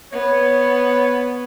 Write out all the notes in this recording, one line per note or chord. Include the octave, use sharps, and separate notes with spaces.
B3 C#5